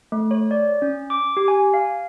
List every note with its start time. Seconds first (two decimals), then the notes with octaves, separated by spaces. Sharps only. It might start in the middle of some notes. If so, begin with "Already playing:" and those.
0.12 A3
0.31 C#5
0.51 D5
0.82 C#4
1.10 D6
1.37 G4
1.48 G#5
1.74 F5